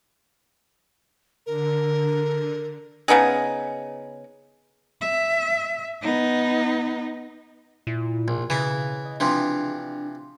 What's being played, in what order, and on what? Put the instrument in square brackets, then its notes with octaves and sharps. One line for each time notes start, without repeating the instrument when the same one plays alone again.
[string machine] D3 [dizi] A#4
[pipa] C#3 B3 D#4 G#4
[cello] E5
B3 D#4
[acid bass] A#2 [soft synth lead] E4
[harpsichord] A#1 [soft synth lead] B2
[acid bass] C#3 [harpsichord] E3 E4
[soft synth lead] D#5
[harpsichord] C3 E3 F3 [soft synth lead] D4